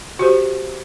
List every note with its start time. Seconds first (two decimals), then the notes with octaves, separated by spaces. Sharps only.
0.19 F#4 G4 C5